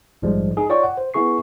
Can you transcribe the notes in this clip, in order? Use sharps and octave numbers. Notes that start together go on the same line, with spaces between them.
A#1 G#2 F3 G3 G#3
D#4 G#4
F4 C#5 D5 G5 C#6
F#5
C5
B3 E4 G#4 C#6 C7